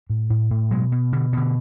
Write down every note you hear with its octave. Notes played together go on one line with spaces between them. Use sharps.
A2
A2
A2
B2 F#3 G#3
B2
B2 D3
B2 D3